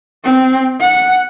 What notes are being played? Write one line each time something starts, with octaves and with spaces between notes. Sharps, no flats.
C4
F#5